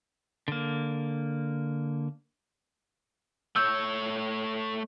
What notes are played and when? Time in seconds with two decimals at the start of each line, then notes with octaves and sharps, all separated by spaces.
0.48 D3 A#3
3.56 A3 C#5 E6 G6